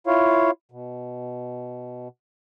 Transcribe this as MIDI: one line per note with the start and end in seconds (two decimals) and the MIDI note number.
0.07 0.51 64
0.07 0.51 65
0.07 0.51 73
0.07 0.51 77
0.72 2.08 47